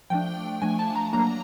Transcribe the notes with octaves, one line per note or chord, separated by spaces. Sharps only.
F3 A3 D4 G5
F3 A3 D4 G#5
A5
A#5
F#3 A#3 D4 A#5